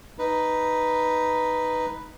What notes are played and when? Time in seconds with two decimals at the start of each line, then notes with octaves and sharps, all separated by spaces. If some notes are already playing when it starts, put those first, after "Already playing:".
0.19 D#4 B4